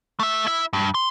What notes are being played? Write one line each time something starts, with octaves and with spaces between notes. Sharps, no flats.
A3 E5
E4 E5
G2
C6